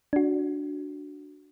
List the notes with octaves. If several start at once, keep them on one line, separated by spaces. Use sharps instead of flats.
D4 F#4